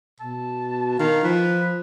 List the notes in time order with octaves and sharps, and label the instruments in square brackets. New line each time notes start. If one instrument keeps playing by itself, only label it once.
[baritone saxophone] B2 [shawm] A5
[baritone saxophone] D#3 [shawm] F5
[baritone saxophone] F3 [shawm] B4